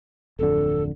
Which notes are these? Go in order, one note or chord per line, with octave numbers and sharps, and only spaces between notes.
D1 F2 D3 A4